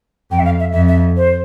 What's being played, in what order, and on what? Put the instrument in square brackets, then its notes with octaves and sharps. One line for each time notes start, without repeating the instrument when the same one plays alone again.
[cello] F2 [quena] G5
[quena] E5
F5
E5
[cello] F2 [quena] E5
[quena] E5
C5